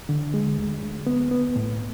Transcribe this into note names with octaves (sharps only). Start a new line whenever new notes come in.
D3
G#3
D2
D2
B3
B3
A2